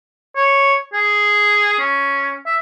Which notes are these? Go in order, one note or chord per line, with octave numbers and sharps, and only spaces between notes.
C#5
G#4
C#4
E5